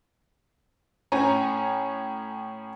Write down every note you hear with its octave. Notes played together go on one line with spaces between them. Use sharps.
A2 C#4 C#5 G#5 A#5